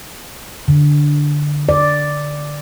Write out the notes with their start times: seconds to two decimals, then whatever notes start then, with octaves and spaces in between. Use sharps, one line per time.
0.68 D3
1.69 D5